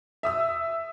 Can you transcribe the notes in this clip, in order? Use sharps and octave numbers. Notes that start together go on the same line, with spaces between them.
E5 D#6 E6